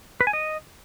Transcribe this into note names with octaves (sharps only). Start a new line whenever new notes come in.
B4
G#5
D#5